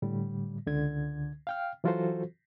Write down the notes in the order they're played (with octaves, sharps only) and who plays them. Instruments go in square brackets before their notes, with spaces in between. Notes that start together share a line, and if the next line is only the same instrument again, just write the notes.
[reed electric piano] A2 D3 G3
C#2 D3 G#6
F5 G5 F6
E3 F#3 F4 F#4 A4 C5